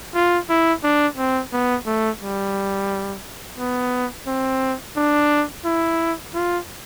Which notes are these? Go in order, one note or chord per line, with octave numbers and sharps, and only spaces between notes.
F4
E4
D4
C4
B3
A3
G3
B3
C4
D4
E4
F4